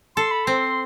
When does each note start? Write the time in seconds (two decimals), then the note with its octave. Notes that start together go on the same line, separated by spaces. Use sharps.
0.16 A4 C6
0.31 B5
0.45 C4 C6